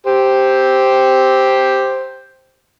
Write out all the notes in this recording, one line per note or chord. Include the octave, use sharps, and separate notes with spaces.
G4 C5